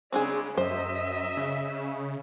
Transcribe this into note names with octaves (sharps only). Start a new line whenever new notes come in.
C#3 G#3 C4 D4 G#4
F#2 C5 D#5 E5
C#3